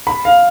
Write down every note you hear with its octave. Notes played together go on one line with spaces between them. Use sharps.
B5
F5